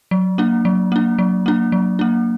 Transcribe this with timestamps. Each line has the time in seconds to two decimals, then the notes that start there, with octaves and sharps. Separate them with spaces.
0.11 F#3
0.38 A#3 D4
0.65 F#3
0.92 A#3 D4
1.18 F#3
1.46 A#3 D4
1.72 F#3
1.99 A#3 D4